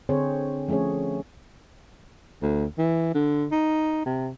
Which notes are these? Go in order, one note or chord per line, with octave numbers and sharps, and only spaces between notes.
D3 C4 G#4 C5 C#5
F3 A3 C#4 G#4 C#5
D2
E3
D3
D#4
C3